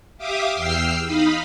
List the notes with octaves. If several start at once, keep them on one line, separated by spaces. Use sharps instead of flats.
G4 E5 F5 D6 D#6
E2 G5 E6 F6 C7
D#4 D#5 F5 B5